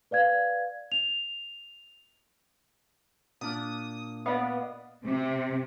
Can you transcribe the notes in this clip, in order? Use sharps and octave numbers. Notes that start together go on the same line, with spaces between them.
B4 D5 F5 G#6
F7
A#2 D4 D#6 F6
B3 D5 D#5 F5
C3